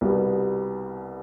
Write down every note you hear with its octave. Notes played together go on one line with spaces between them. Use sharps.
C2 B2 G3 B3